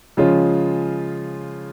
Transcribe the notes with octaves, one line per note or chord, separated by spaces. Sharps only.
C#3 F3 G#3 C#4 F4